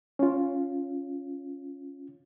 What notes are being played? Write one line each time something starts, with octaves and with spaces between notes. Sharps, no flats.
C#4 F4